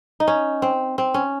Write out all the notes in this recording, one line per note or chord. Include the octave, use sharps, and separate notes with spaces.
D#4
C#4
C4
C4
C#4